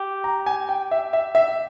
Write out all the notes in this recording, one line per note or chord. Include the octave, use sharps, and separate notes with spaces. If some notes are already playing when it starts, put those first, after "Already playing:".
Already playing: G4
A#5
G#5
G5
E5
E5
E5